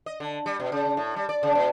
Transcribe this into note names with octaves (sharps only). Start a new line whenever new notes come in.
D#5
D3
G3
B2
C#3
A2
G3
D5
C#3
B2